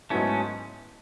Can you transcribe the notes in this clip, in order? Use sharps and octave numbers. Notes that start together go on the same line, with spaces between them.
G#2 F#3 A3 B3 C#4 E4